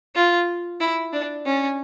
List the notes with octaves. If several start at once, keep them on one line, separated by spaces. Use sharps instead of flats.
F4
E4
D4
C#4